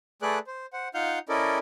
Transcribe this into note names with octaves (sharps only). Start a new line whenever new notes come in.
A3 G#4 A4 B4 D5 F#6
C5
C5 F#5
D#4 F4 F5 F#5 F6 G6
C#4 E4 A4 A#4 D5 D#5